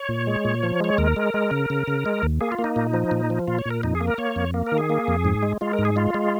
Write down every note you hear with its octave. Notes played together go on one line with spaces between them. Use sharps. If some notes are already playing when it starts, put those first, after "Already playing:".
Already playing: C#5
A#2
G#3
A#2
F3
G#3 C#5
D#2 A#4
G#3
G#3
C#3
C#3
C#3
G#3
D#2
A#3 G#4
F4
A#3
D#4
A#2
F3
A#2
F3
A#2 F4
C#5
A#2 A#4
F2 D#4
G#4
A#3
A#4
A#3 C#5
F2
A#3
A#4
D#3
G#4
A#3
F2
G#2
G#3
G#3 F4
A#4
G#2
G#4
G#3 F4
G#3